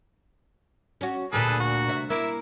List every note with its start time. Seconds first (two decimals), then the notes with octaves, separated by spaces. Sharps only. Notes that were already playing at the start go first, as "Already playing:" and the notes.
1.01 C#4 F#4
1.33 D2 A#2 G#4 A4 B4
1.60 F#4
1.88 C3 E5
2.10 A#3 E4 E5